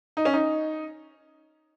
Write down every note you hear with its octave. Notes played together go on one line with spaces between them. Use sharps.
D#4
C#4
D#4